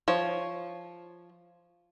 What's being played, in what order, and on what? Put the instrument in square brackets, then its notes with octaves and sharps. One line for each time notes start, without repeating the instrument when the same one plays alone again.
[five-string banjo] F3 C#5